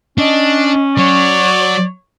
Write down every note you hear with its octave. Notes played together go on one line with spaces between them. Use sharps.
C#4 D4 D#5
F#3 C#5 D5